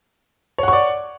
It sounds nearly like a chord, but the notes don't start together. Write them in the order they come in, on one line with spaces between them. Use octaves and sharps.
C#5 F#5 C#6 D5